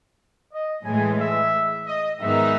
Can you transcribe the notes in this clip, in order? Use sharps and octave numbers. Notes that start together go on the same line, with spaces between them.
D#5
A2 E3 G#3 G#5
E5
D#5
G#2 D#3 G#3 B3 D#4 E5